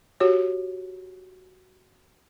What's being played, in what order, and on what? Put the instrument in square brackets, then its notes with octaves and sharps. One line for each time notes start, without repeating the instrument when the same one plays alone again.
[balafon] F#4 G4 C#5